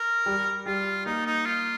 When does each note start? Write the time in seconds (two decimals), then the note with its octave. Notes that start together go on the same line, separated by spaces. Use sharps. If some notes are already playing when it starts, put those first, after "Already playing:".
Already playing: A#4
0.26 G3
0.66 G3 F4
1.06 A#3 D#4
1.26 D#4
1.46 F4